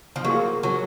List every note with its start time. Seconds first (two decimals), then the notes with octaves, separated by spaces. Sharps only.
0.16 F3
0.25 F#3 A#3 F4 G#4
0.63 F#3